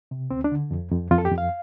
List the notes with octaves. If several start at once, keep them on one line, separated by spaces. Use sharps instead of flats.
C3
D2 C4
D4
D3
F2
F2
F2 F4
A4
G4
F2
F5